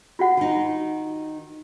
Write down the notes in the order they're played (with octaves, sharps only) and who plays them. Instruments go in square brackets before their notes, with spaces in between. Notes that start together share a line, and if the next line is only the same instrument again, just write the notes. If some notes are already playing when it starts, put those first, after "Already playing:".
[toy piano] F4 F#4 F#5
[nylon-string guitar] D#3 D#4